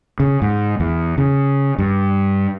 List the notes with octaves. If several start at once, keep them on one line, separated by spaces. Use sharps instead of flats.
C#3
G#2
E2
C#3
G2